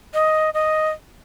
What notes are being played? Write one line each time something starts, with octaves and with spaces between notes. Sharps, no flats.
D#5
D#5